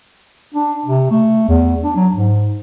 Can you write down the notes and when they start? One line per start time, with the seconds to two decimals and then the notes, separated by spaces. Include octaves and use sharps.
0.55 D4
0.86 C3
1.11 A3
1.48 E2
1.83 D4
1.96 F#3
2.14 G#2